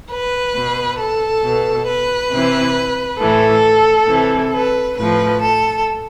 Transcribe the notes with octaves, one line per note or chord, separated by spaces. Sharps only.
B4
B2
A4
B2
B4
C3
E3
A2 E3 A4
C3 E3
B4
A2 F3 B4
A4